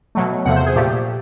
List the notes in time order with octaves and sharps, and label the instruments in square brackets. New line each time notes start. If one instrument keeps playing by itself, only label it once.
[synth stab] B2 F#3 A3
E2 C3 F3 A3 F#5
C5
G#4
A#2 F3 A3 G4